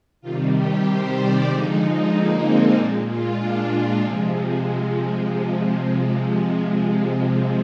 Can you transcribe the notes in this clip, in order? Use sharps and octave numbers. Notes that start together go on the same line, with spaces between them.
C3 D#3 G3 F4
G4
C5
D5
D3 F3 G#3 D#4
A#3
C4
A#2 G#3 D4
F4
D4
C3 F3 G#3 C4